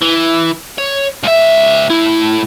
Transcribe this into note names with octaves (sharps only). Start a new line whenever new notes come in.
E3
C#5
C#2 E5
A2 E4